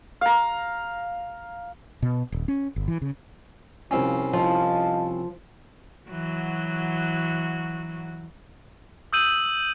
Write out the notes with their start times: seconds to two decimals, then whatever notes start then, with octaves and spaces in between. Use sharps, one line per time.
0.21 F5 A#5
2.02 B2
2.32 D#1
2.48 C#4
2.76 G1
2.88 E3
3.02 C#3
3.91 C2 F3 C4 C#4
4.33 F3 D#5 F5 A5
6.10 E3 F#3 F#4
9.13 D#6 E6 G6 D#7 F#7